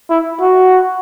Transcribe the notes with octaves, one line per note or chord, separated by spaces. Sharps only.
E4
F#4